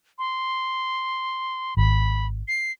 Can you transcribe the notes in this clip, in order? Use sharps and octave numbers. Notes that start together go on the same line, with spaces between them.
C6
G#1 B5
C7